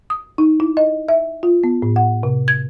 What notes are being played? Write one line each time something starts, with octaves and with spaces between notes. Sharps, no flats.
D#6
D#4
E4
D#5
E5
F4
B3
A2
F#5
C3
G#6